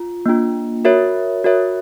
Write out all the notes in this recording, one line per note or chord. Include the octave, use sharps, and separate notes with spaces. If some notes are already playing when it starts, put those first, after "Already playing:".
Already playing: F4
A#3 D4 F4
F#4 A#4 C#5 E5
F#4 A#4 C#5 E5